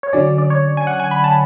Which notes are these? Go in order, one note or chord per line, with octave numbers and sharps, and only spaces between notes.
C#5
D3 F#3 C#4 D5
D5
C#5
G#5
F#5
G#5
B5
A5